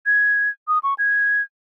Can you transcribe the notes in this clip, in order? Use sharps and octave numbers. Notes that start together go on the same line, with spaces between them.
G#6
D#6
C#6
G#6